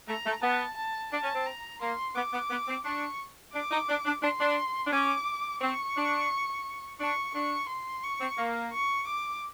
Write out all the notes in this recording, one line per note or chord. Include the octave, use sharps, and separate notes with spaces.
A3 A#5
A3
B3 A5
A5
D4 A5
C#4
C4
A#5
A#3 C6
B3 D6
B3
B3
C4
D4 C#6
D4 D6
D#4
D4
D4
D4 C6
D4
D4
C#4 D6
C4 C#6
D4
D4 C#6
D4 C#6
C6
C#6
C4
A#3
C#6
D6